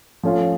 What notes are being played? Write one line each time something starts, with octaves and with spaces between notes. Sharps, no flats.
F3 A3 C#4 F4